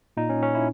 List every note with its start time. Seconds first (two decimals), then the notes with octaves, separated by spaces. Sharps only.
0.17 A#2 D#4
0.30 C#4
0.42 C#4
0.55 E4